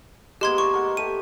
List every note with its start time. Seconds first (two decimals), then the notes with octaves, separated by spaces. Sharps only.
0.41 G#3 A#3 B3 G4 C6 G#6
0.58 D5 C#6 D6
0.73 A#4 F#5
0.97 A3 G4 D#7